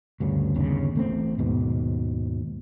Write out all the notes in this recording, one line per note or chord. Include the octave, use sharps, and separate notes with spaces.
D2 G2 C#3
G1 D#2 C#3
A1 A3 C4
D#2 G#2 B2